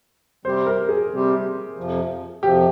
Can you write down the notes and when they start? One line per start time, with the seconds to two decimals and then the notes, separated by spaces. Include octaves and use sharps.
0.45 C3 G3 C4 G4 C5
0.66 A#4
0.89 G#4
1.11 C3 G3 C4 G4
1.77 F2 C3 F3
2.43 F2 C3 F3 G4